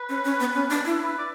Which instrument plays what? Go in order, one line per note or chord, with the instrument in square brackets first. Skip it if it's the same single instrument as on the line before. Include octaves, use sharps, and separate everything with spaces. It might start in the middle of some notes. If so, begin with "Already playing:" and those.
Already playing: [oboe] B4
[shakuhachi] C#4
C#4
B3
C#4
D4
E4
[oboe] B4
D5